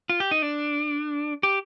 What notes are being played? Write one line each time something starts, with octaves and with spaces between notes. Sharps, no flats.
F4
G4
D#4
D4
G4